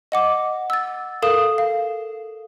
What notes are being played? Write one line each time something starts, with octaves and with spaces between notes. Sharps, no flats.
D#5 F#5 D6
E6 A6
A4 A#4 F5 D#6 E7
F5